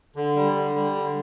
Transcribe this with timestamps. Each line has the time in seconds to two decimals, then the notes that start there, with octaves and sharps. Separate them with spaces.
0.16 D3
0.36 G3
0.55 D3
0.75 G3
0.95 D3